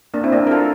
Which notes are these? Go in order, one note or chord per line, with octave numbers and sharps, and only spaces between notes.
A#3 D4
C4 E4
A#3 D4
A#4
F4 A4